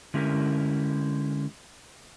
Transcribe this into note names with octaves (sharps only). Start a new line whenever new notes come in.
D3 G#3 C#4 E4 G4 A#4